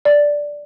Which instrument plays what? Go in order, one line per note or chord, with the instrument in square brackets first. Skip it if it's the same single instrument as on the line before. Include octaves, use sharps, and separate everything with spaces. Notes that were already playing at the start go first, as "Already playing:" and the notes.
[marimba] D5